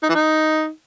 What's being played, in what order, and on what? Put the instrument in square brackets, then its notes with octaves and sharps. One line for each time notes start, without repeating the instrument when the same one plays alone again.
[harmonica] D#4
E3
D#4